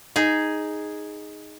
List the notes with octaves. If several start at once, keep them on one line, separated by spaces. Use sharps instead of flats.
D#4 G#4